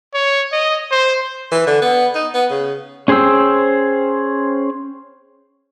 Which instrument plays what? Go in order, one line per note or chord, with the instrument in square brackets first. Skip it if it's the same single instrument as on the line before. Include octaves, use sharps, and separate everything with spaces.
[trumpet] C#5
D#5
C5
[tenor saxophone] E3
D3
B3
D#4
B3
C#3
[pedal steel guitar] C#4 G#4 C5 G5 E6